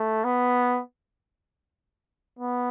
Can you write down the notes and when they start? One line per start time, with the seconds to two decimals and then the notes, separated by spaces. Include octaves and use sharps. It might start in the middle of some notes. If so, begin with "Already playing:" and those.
Already playing: A3
0.24 B3
2.39 B3